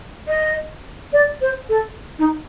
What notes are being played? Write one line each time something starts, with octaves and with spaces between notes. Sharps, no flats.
D#5
D5
C5
A4
D#4